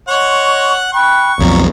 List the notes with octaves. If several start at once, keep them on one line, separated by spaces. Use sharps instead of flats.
C#5 D#5 F#5 C6 C#6
G5 B5 C#6 F#6
B1 F2 A#5